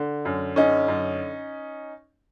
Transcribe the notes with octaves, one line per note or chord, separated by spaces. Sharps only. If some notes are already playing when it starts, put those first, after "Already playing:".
Already playing: D3
F#2
D3 C#4 D#4
F#2